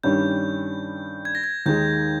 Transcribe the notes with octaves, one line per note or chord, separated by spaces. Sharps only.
G2 D#3 G3 C#4 G6
G#6
A#6
G#6
D#2 D#3 G#3 G6